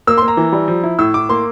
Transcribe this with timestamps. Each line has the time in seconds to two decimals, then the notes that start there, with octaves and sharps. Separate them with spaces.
0.07 A#3 E6
0.18 C6
0.22 A#3
0.28 A#5
0.37 E3
0.52 G3
0.68 F3
0.83 E4
0.99 A2 E6
1.14 A2 D6
1.29 A#3 C6